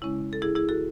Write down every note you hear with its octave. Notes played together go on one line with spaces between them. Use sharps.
C#3 G#3 C#4 E4
A4
E4 G#4
E4 G#4
F#4 A4